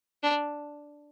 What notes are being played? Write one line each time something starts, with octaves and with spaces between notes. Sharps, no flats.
D4